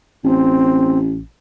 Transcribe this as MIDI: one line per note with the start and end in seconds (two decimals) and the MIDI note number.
0.24 1.22 33
0.24 0.99 60